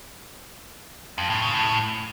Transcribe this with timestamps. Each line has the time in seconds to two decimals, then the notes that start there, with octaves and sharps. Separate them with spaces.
1.18 F2
1.30 A2
1.42 C#3
1.54 A2